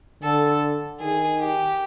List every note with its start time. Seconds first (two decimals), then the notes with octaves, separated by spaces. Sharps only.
0.23 D3 A4
1.01 D#3 G#4
1.40 G4